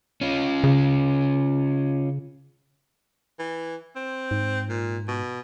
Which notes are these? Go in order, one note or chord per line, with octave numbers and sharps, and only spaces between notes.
C#4 F4
C#3
E3
C4
G#2
A#2
B2